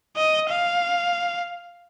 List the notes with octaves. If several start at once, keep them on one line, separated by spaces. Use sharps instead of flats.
D#5
F5